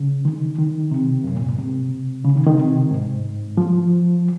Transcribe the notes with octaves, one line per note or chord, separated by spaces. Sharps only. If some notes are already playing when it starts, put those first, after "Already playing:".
Already playing: C#3
D#3
D#3
C3
F#2
A#2
G#2
C3
C#3
D#3
D#3
C3
G#2
F3